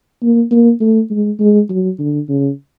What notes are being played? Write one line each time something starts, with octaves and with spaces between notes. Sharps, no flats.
A#3
A#3
A3
G#3
G#3
F#3
D3
C#3